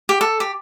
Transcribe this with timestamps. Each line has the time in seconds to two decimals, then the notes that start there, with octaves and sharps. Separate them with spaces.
0.09 G4
0.21 A4
0.40 G4